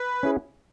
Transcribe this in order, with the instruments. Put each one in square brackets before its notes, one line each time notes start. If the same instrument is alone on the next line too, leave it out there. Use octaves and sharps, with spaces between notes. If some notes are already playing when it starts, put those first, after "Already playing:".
Already playing: [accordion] B4
[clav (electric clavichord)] C#4 E4 G#4